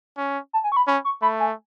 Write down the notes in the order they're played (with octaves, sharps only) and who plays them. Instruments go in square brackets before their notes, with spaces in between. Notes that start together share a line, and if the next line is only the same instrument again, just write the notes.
[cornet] C#4
[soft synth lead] A5
G#5
C#6
B5
[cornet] C#4 [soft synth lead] B5
[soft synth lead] C#6
[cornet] A3 [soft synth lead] B5
[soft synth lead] G#5